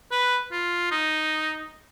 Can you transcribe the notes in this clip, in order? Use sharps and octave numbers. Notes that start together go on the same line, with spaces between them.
B4
F4
D#4